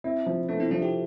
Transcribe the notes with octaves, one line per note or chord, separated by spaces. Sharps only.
C4 E4
F3
A3 B3 D4
C4 E4
F3 D4 F4
E4 G4